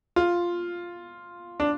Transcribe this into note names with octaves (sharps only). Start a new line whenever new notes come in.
F4
D4